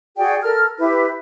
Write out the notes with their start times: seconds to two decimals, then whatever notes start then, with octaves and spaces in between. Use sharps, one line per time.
0.17 F#4 G#4 D5 G5
0.42 A4 A#4 F6
0.77 E4 G4 B4